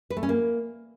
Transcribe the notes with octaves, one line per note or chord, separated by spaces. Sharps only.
B4
A3
C#4
A#3